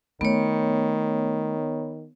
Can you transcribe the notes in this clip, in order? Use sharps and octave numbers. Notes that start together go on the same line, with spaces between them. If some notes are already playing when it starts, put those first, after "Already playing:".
D#3 A3 B3 C#5